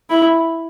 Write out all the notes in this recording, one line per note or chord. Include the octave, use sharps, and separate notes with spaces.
E4